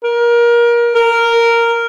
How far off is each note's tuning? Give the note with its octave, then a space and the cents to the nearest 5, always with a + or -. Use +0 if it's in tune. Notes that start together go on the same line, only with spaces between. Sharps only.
A#4 +25
A#4 -5